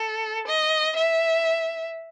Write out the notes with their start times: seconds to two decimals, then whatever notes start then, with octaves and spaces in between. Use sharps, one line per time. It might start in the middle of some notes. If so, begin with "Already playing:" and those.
Already playing: A4
0.47 D#5
0.96 E5